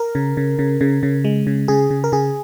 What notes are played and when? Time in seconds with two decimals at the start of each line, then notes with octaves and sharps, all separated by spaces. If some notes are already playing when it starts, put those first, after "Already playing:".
Already playing: A#4
0.15 C#3
0.37 C#3
0.59 C#3
0.81 C#3
1.03 C#3
1.24 G#3
1.47 C#3
1.68 C#3 G#4
1.90 C#3
2.04 A#4
2.12 C#3 G#4